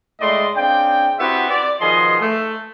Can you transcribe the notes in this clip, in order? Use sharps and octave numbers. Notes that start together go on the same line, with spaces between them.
A2 G#3 A3 D5 D#5 C6
C#3 C4 D4 G5
B3 C4 E4 F#4 G4 E5
D5
B2 D#3 F3 G#4 D#5 C6
A3